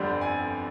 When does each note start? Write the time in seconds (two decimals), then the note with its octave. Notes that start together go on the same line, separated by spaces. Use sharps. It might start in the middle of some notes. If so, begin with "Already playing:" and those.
Already playing: G1 F2 D3 G3 C4
0.21 G#5